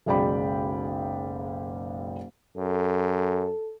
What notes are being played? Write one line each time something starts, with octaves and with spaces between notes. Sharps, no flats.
F#1 B1 G#3 D5 G5 B5
F#2 A4